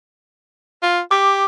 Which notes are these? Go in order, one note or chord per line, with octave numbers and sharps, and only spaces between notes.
F4
G4 D6